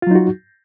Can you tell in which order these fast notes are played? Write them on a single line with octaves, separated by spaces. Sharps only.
F4 F#3 D#4 F#4